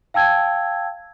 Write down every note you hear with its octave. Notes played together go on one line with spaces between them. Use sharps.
F5 G5 A5 E6 G#6